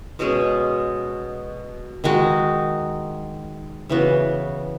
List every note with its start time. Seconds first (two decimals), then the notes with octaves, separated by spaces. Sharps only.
0.19 B2 G#3 C#4 G#4
2.04 D#3 G#3 D#4 F#4
3.89 C#3 E3 B3 F#4